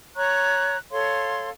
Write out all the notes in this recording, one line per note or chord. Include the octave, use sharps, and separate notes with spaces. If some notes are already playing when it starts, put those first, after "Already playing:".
C#5 A#5 C#6 F#6
A4 C#5 F5 C6